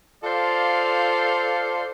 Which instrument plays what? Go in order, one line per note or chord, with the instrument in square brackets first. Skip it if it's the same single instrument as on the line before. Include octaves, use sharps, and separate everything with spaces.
[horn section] F4 A4 C5 D5 F5